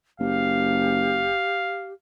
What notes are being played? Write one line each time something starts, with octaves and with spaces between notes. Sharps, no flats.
F#1 G4 F5